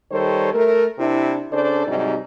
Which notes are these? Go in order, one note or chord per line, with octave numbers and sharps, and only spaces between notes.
D#3 G3 A4 C5 C#5
A3 A#4
C3 D4 E4
C#3 D4 A4 C5 D5
G#2 C3 F#3 G3 D#4